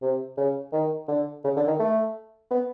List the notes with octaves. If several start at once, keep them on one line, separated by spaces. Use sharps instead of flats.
C3
C#3
D#3
D3
C#3
D3
D#3
A3
B3